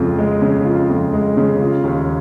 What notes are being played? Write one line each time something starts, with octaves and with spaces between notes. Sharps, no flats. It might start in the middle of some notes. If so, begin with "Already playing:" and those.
Already playing: F2 C#3 G#3 F4
G#3
C#3
F4
F2
G#3
C#3
F4
D#2